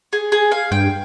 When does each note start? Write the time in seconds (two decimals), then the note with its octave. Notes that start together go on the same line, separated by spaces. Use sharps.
0.13 G#4
0.32 G#4
0.52 F5
0.71 G2 G5